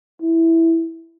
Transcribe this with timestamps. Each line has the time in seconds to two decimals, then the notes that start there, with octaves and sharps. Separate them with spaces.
0.22 E4